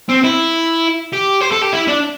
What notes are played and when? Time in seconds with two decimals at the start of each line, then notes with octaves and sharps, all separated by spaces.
0.09 C4
0.24 E4
1.13 G4
1.41 C5
1.52 A4
1.62 G4
1.73 E4
1.88 D4